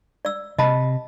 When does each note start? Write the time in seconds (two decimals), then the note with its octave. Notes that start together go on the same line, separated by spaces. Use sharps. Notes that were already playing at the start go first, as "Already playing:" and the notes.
0.25 D5 E6
0.59 C3 D#5 A5 B5